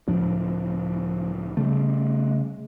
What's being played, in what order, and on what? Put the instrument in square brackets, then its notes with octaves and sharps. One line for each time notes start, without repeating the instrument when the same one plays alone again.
[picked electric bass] C#2 A2 D4 [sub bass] F3
[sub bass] C#3 [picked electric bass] G3 A3